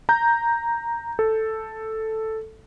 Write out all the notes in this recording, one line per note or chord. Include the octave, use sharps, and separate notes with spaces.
A#5 G6
A4